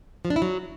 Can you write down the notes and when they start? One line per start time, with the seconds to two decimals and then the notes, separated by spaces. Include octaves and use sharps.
0.25 F3
0.30 D4
0.36 E4
0.42 F#3